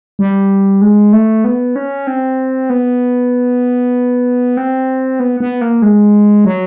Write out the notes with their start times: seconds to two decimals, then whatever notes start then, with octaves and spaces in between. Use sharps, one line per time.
0.19 G3
0.82 G#3
1.13 A3
1.44 B3
1.76 C#4
2.07 C4
2.70 B3
4.57 C4
5.20 B3
5.40 B3
5.61 A#3
5.82 G#3
6.45 F#3